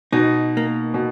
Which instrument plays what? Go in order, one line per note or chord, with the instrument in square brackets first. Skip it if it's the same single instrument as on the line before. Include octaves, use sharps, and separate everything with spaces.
[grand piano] B2 [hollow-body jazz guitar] D#4
[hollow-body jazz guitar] A#3
[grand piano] B2